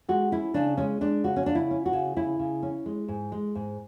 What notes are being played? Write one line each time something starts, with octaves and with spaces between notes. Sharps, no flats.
G#3 F#4
C#4 E4
C#3 D4
G#3 C#4
G#3 D4
C#3 F#4
C#4
C#3 D4
E4
C#4
F#4
C#3
C#3 E4
C#3
C#4
G#3
G#2
G#3
G#2